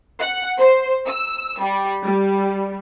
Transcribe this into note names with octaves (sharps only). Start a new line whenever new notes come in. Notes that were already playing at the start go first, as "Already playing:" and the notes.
F#5
C5
E6
G3
G3